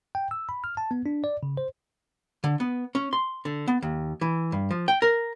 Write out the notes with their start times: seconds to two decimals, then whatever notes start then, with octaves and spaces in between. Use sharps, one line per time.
0.15 G5
0.31 E6
0.49 B5
0.64 F6
0.77 A5
0.91 B3
1.06 D4
1.24 D5
1.43 C#3
1.57 C5
2.44 D3
2.60 B3
2.95 C#4
3.13 C6
3.45 D3
3.68 B3
3.82 D#2
4.21 E3
4.52 G2
4.71 F3
4.88 G5
5.02 A#4